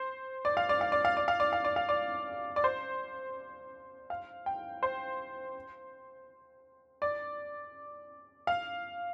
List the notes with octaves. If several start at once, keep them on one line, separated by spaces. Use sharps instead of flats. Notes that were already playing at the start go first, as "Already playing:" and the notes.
Already playing: C5
D5
F5
D5
F5
D5
F5
D5
F5
D5
F5
D5
F5
D5
D5
C5
F5
G5
C5
D5
F5